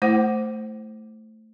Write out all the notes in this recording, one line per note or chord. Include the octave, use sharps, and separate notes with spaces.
A3 E4 C5 F#5 D6